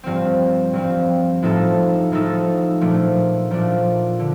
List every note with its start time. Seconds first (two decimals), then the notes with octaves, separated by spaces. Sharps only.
0.04 G2 F3 C4
0.73 G2 F3 C4
1.43 A2 F3 A3 D#4 A4
2.12 A2 F3 A3 D#4 A4
2.81 A#2 F3 A3 D4
3.51 A#2 F3 A3 D4
4.19 D3